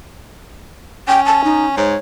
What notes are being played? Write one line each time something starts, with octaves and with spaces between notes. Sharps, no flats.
C#4 G5
A5
D#4
G#2 C#5